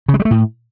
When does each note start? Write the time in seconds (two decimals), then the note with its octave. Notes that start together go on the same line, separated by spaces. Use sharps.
0.08 C#3
0.14 G#3
0.20 G3
0.25 A3
0.31 A2